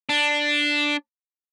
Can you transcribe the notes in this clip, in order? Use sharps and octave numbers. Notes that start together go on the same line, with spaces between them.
D4